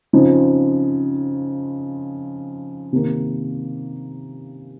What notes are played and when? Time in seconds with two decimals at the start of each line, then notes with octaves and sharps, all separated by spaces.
0.13 C#3 F3 C4 D#4
2.93 C3 D#3 A#3